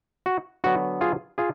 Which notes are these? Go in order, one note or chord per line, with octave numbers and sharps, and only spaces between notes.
F#4
D3 F#3 B3 F#4
F4 G#4
F4 G#4